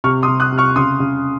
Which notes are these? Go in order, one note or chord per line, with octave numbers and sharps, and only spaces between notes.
C3 C#6 F6
C6 D#6
C3
D#6 F#6
C3
C#6 F6
C#3 C6 D#6
C#3